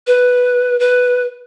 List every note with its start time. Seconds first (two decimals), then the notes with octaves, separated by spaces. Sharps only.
0.07 B4
0.80 B4